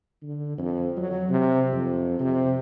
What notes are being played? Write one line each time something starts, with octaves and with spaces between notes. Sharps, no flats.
D3
F2
F#3
C3
F2
C3